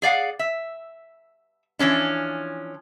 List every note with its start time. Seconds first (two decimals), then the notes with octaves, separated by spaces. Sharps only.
0.02 G#4 D5 F5 F#5
0.39 E5
1.79 E3 F3 C#4 D4